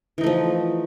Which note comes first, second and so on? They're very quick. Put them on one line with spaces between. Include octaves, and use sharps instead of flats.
E3 D#4 A3 F3